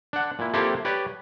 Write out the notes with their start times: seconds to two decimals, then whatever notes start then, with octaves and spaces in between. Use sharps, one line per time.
0.13 D4 F#5
0.39 A#2 E4
0.54 A#3 C4 E4 F4 G4 A4
0.85 G4 B4 C#5 D5